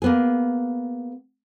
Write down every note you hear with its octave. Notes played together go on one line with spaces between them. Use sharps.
A#3 B3 G#4